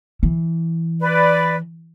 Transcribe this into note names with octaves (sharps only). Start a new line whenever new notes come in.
E3
B4 D5